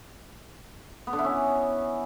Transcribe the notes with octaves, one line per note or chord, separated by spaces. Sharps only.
B3
D3
E4
C#4